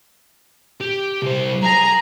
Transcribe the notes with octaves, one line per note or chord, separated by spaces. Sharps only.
G4
C2 C5
G#4 A#5